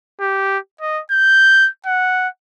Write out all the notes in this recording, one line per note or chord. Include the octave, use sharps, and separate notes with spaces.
G4
D#5
G6
F#5